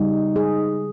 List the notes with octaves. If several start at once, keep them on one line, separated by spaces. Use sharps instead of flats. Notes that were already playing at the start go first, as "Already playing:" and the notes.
Already playing: C#3 G3 D#4
G#4